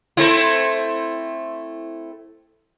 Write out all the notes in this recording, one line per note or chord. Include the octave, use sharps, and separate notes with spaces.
A3 C4 E4